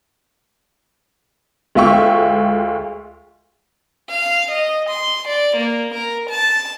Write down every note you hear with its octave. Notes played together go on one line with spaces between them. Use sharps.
D2 G#3 F4 E5 G5 C#6
F5
D#5
C6
D5
A#3
A#4
A5